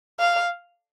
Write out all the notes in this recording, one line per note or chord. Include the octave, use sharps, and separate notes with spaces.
F5